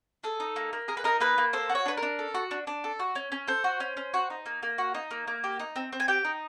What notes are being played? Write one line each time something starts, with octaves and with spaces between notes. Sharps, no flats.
G#4 A4
D#4
A#3
A#3
G#4 A#4
B4
D#4 A#4
A#3 B4
A#3
A4 C5
F#4
C#5
D4 B4
A#4
D4
A4
F#4
D4
D4
A4
F#4
C#4
C#4
A4 C5
F#4
C#4
C#4
F#4
D#4
A#3
A#3
F#4
D#4
A#3
A#3
G4
D#4
C4
C4
G#5
G4 G5
D#4